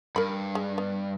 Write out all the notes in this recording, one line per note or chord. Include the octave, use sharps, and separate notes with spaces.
G2 A#4 B5
G#3
B3